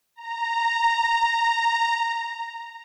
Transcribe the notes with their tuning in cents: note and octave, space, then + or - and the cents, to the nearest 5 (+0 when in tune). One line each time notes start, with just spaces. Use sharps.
A#5 -10